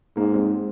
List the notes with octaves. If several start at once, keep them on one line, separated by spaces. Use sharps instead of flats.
G#2 A#3
G#3 C4